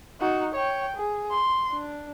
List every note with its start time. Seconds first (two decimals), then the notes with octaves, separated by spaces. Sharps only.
0.20 D#4 F#4
0.55 C#5 G5
0.96 G#4
1.31 C6
1.72 D4